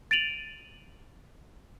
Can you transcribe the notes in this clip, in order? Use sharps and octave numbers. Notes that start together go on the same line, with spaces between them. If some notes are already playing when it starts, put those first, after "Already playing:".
A6 D7 D#7 F7 F#7